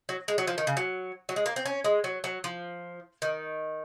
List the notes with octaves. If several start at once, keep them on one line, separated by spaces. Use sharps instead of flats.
F#3
G#3
F#3
F3
D#3
C#3
F#3
F#3
G#3
A#3
C4
C#4
G#3
F#3
F#3
F3
D#3